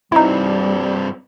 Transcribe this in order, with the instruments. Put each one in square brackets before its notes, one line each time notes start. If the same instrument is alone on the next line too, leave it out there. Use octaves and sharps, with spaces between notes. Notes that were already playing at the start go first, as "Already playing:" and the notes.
[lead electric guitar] G2 C4 [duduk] G3 [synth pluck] D#4 E4